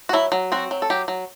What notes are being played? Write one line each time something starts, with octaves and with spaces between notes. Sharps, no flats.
F#4
F#3 E4
F#3
C4 F#4
F#3
A4
F#3 G4
F#3